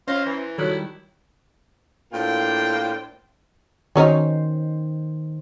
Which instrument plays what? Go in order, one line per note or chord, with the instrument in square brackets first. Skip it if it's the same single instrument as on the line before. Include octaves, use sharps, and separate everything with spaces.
[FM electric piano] C#4 A#6 [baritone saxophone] F4 [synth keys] C5
[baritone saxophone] E3
[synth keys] D#3 G3 [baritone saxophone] E4 [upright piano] F#4 C#5 F#6 [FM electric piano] A4
[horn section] A2 A#3 D4 F4 C5 G5
[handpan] D#3 C5 [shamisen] F#3 C#4 D#4